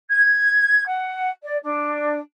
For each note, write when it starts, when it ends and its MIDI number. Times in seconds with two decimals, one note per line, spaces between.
0.08 0.83 92
0.86 1.28 78
1.42 1.55 74
1.61 2.18 62